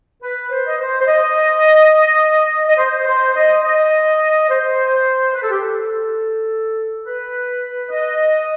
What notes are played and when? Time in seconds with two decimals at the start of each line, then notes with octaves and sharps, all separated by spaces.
0.22 B4
0.51 C5
0.67 D#5
0.79 C5
1.00 C5
1.07 D#5
2.68 D#5
2.78 C5
3.07 C5
3.35 D#5
3.63 D#5
4.49 C5
5.34 B4
5.43 A4
5.50 G4
5.58 A4
7.06 B4
7.91 D#5